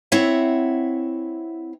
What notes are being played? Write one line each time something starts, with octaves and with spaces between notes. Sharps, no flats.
C4 E4 C#5 E5 F#5